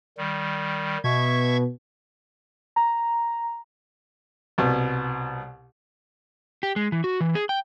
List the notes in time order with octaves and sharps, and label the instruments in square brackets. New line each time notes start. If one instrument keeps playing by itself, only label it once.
[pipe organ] D#3 G3
[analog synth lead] B2 [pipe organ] E5 C#6 G#6
[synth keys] A#5
[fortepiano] C2 B2
[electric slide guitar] G4
G#3
E3
F#4
E3
G#4
G5